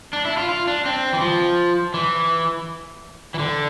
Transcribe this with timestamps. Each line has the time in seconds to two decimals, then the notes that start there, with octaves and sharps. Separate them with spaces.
0.13 D4
0.25 E4
0.37 F4
0.49 F4
0.67 D4
0.86 C4
1.13 E3
1.21 F3
1.94 E3
3.34 E3
3.39 D3